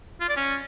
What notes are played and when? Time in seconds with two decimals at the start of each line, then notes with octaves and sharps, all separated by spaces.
0.21 F4
0.29 D5
0.36 C#4